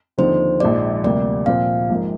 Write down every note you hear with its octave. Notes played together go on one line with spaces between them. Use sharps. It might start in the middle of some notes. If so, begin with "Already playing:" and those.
D#2 D3 F3 C4 D#4 C5
A#1 G#2 F3 G#3 D5
D2 C3 G3 A#3 D5
A#2 F3 C4 F4 F5
A#1 G#2 F3 A#3